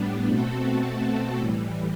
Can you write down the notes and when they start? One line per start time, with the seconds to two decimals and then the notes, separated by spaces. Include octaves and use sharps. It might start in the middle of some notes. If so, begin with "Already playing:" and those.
Already playing: A2 G3 B3 D4
0.27 B2 A3 C4 F#4 A4
1.38 A2 E3 G3